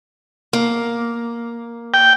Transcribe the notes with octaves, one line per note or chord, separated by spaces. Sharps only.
A#3
G5